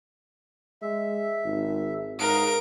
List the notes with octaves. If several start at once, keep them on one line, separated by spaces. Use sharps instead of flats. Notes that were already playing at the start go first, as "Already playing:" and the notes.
G#3 E5
G#1
G#2 A#4 F5 F#5 D#6 D7